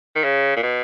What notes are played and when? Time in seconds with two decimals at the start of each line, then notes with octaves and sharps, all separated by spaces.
0.15 D#3
0.24 C#3
0.56 A#2
0.63 B2